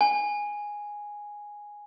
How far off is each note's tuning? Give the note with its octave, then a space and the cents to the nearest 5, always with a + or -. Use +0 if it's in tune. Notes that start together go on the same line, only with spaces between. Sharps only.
G#5 -5